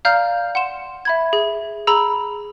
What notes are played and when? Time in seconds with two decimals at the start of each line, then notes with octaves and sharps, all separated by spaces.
0.05 D5 F5 A#5 F6 G6
0.55 F#5 C6 E7
1.05 E5 B5 G#6
1.33 G#4
1.87 G#4 A#5 B5 E6 F7